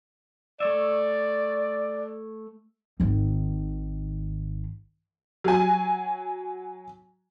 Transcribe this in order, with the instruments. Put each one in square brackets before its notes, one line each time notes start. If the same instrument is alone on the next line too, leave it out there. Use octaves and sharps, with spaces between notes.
[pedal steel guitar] A3 C#5 E5 [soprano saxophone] D5
[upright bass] G#1 D#3
[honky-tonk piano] F#3 G#5